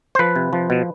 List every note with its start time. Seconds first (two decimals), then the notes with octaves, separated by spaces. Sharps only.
0.15 C5
0.19 F3 B4
0.36 C3
0.53 F3
0.70 B2